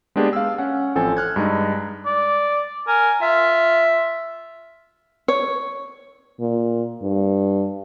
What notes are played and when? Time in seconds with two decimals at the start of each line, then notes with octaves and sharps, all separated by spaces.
0.16 G#3 A#3 B3 D4 G4 G#4
0.33 F5 E6
0.58 C#4 F#5
0.95 A1 F3 C4 A4 G#5
1.17 F6 F#6 G#6
1.36 G2 G#3 D#4
2.06 D5
2.88 A#4 G#5
3.22 F4 E5
5.28 C#5
6.40 A#2
7.03 G2